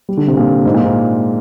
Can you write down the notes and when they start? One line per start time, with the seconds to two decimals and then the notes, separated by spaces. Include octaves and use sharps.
0.09 G3
0.17 D3
0.27 C3
0.37 A#2
0.66 G#2
0.74 A#2
0.84 G#2